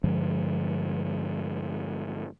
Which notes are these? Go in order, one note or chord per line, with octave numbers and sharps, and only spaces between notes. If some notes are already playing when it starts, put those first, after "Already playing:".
G2 D3 F3 G#3